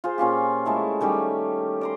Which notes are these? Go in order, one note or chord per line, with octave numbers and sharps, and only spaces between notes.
F4 G#4 C5
A#2 C#4 F4 G4
G#3 A3 E4 A4
D#3 G3 C#4 G4
D5 A#5 C6